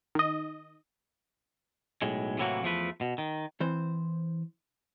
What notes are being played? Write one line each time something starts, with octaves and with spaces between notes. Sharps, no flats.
D#3 D#5
B1 A2 G#3
A2 C3 E3 F#3 A#3 F#4
E2 F3 A3 B4
B2
D#3
E3 C4 C5